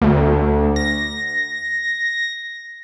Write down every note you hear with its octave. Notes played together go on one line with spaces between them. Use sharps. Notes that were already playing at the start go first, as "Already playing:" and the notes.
D2
A#6